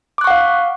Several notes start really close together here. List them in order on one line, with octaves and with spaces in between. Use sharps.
D6 F#6 C#6 F#5 F5